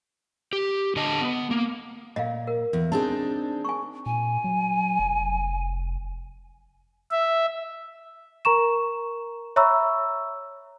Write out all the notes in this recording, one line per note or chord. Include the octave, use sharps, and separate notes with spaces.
G4
D3 D#5 A5
B3
A#3
A#2 D#5 F5
A#4
E2
C4 D4 D#4 G#4 A5
G#5 C#6
A#2 G#5
F#3
F1
E5
A#4 A#5 C#6 E7
C#5 E5 A#5 B5 C#6 E6